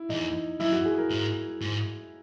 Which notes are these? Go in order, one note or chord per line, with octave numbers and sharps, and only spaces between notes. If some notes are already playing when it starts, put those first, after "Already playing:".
Already playing: E4
E2 D#4
F#2 E4
F#4
G#4
A#4
G#2
G#2